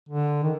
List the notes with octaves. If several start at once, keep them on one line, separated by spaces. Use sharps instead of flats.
D3
D#3